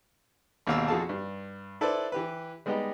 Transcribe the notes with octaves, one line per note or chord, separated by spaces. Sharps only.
G#1 D#2 B2 F5 D6 E6
F2 F#4 G#4 A4 F5 A5
G2
E4 A4 B4 C5 D5
E3 G4 B4
G3 G#3 B3 D#4 G4 D#5